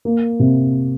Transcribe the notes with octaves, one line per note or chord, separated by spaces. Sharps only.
A#3
C3